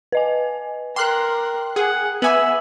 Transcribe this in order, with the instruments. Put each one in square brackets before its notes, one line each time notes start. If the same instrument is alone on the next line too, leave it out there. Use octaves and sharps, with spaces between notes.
[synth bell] B4 D#5 G#5
[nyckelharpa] A#4 [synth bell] G5 D6 F6 [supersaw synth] C6 F#6
[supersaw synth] G#4 [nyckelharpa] F#5
[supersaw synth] B3 G#5 [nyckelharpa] E5 [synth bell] D6 F#7